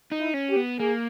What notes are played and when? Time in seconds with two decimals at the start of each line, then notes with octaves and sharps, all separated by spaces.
0.12 D#4
0.19 E4
0.34 C#4
0.49 G4
0.56 B3
0.79 A#3 G#4